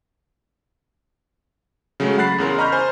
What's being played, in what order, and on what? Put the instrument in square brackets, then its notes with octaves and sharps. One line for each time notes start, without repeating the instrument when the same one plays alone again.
[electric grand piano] C#3 F#3 G#3 A3
F#5 B5 F#6 A6 C7
E2 C#3 A#4 C6
D#5 A#5 B5 C#6 F6 G6
C5 G#5